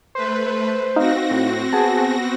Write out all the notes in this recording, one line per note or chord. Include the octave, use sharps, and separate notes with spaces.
A3 B4 C5
C4 D#4 F#4 F5 A#6
A2
B3 G#4 G#5 A5